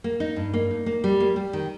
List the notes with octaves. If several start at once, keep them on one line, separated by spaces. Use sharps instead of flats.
A#3
D#4
G2
A#3
D#4
A#3
G3
A#3
G3
D#3